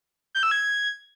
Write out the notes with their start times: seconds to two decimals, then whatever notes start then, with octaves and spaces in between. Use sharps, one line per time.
0.35 G6
0.43 E6
0.51 G#6